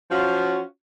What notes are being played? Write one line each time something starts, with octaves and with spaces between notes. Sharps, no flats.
F3 C#4 F4 F#4